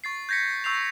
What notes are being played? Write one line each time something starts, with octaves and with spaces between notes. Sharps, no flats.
C#6 A6 C7
G6 G#6 A#6 B6 C#7
C#6 E6 G6 C7 F7